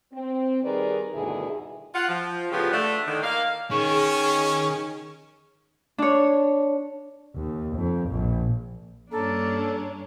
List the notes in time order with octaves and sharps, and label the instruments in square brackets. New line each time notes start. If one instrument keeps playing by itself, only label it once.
[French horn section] C4
D#3 G3 G#4 A#4 B4 D5
D2 G2 B2 D#3 E4 G#4
[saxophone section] F4 F#5
F3
A2 C#3 F3 B3 G4
D3 A3
A2 D3 D#3
A#3 F5
[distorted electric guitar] D#3 [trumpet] C#4 [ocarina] G#4 [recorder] C#6
[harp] D4 C#5
[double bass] D#2
F2
A#1
[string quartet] G2 C#4 D4 [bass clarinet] A#3 [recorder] A4